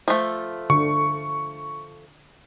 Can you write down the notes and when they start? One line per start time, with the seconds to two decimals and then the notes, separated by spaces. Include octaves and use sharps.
0.08 F3 A3
0.70 D3 C#6